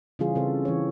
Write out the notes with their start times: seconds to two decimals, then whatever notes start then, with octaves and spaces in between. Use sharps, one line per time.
0.19 C#3 E3 G3 C#4 F4 G#4
0.35 C#3 C4 A4
0.65 E3 C#5